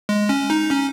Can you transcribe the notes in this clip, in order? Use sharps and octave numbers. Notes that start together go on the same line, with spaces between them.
G#3
C#4
D#4
C#4